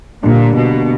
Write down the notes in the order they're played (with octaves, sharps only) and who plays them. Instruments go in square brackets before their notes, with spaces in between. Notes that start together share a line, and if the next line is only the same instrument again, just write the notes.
[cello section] A#2 [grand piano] D3 G3 A#3 D4
[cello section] B2